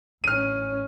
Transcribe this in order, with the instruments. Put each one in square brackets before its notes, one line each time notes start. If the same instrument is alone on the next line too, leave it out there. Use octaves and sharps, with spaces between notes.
[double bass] A1 C#4 [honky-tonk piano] F6 D#7